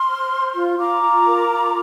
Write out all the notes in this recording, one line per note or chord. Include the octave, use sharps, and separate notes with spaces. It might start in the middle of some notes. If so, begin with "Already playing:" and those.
Already playing: C6 F6
C5
C5
F4
F4 A#5 D6
F4
A#4
F4